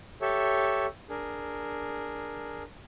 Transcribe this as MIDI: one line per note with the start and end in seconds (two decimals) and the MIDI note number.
0.21 0.86 67
0.21 0.86 69
0.21 0.86 73
0.21 0.86 76
1.09 2.63 62
1.09 2.63 68
1.09 2.63 70